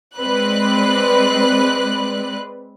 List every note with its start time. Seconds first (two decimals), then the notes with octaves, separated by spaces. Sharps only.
0.16 G#3 C4 B4 D5 F#6